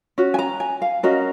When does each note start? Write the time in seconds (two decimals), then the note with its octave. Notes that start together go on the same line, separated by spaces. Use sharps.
0.18 C#4 F#4
0.34 G#5
0.39 A#5
0.60 G#5
0.82 F5
1.03 C#4 F#4 A#4 D#5